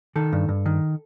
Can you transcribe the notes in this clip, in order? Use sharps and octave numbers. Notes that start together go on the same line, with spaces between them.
D#3 A4
G2
G2
D#3